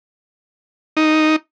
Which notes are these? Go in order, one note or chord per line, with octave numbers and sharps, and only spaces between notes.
D#4